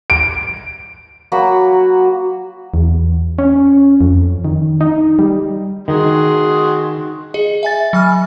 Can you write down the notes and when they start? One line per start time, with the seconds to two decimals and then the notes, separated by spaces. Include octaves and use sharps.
0.10 D7
1.32 F#3 A#3 F#4 B5
2.74 E2
3.39 C#4
4.01 F2
4.45 D#3
4.81 D#4
5.19 G3
5.88 D#3 F#4 G#4 C6
7.34 G#4 D#5
7.63 E5 G#5 A6
7.93 F#3 G#5 F6